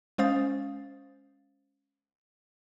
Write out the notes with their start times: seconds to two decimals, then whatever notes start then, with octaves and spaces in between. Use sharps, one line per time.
0.18 G#3 C#4 C5 F5 D#6 A6